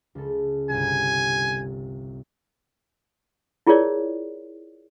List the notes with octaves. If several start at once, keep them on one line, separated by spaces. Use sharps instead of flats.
C#2 A4
G1 C2 G#5
E4 F4 G#4 A#4 C#5 D5